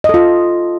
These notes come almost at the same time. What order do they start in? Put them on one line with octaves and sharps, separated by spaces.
D#5 A4 F4